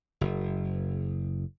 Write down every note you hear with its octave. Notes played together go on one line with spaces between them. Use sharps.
F#1